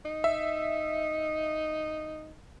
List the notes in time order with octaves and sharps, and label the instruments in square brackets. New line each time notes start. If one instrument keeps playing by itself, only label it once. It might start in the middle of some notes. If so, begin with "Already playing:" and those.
[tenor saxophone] D#4
[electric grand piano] E5